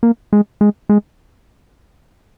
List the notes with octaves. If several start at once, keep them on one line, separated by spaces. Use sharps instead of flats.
A#3
G#3
G#3
G#3